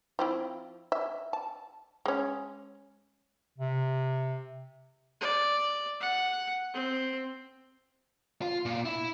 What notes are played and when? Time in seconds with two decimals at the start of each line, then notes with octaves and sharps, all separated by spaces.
0.19 F3 C4 E4
0.92 E5
1.33 A5
2.06 G#3 C#4
3.58 C3
5.21 D5
6.01 F#5
6.74 C4
8.42 F4
8.66 A#2
8.85 E4